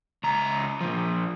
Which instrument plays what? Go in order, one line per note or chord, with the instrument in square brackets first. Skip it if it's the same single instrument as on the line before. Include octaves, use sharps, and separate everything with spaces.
[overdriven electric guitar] C#2 A#5
A#2 F3